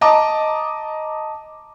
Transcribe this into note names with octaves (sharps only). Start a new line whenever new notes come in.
D#5 A5 A#5 D6